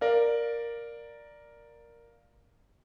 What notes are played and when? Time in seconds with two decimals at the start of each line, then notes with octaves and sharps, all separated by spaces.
0.01 A#4 D5 F5